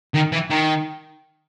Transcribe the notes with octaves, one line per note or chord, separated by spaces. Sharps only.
D#3
E3
D#3